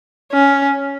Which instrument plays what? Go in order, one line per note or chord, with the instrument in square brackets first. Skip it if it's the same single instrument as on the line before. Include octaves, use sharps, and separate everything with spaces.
[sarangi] C#4